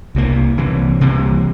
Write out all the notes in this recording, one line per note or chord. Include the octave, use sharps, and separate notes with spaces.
C2 C3 E3 A#3
C2 C3 E3 A#3
C2 C3 E3 A#3